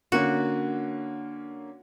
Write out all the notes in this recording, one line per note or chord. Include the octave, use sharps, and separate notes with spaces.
D3 A#3 C#4 F#4